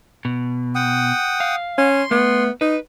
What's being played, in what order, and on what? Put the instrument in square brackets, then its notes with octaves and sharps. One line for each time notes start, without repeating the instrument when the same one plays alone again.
[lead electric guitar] B2
[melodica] F#5 G5 D#6
[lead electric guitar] F5
[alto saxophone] C#4 [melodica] C6
[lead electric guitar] A3 [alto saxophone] B3
[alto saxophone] D#4 [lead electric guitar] B4